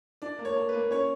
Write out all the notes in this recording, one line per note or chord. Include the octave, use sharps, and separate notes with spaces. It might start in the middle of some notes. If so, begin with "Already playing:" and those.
D4 D5
A#3
C#5
A#3
B4
A#3
C#4 C#5